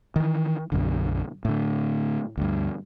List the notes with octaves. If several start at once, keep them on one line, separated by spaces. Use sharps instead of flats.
D#3 E3
B1 F#2 D3
A2 D3
D2 G2